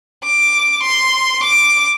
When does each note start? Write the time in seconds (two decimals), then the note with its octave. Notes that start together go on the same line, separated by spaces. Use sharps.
0.24 D6
0.83 C6
1.43 D6